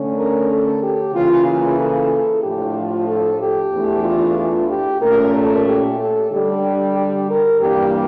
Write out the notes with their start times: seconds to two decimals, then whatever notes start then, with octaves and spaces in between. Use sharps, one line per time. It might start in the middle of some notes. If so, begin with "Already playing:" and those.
Already playing: D3 A3 C#4
0.17 A#4
0.49 A4
0.82 G4
1.14 C#3 E3 A#3 F4
1.46 F4
1.79 A4
2.43 A2 F3 A3 D4 G4
2.76 F4
3.08 A4
3.41 G4
3.73 E2 E3 A3 D4
4.05 F4
4.38 F4
4.70 G4
5.02 A#2 A3 C#4 A#4
5.34 A4
5.66 G4
5.99 A4
6.31 D3 G3 D4 G4
6.95 G4
7.28 A#4
7.60 G2 E3 G3 A#3 D4 G4